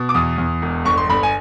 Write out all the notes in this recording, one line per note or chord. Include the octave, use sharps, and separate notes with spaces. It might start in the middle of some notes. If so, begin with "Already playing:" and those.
Already playing: B2
D6
E2 D#6
E2
E1
G1 C#6
C6
G1 B5
G#5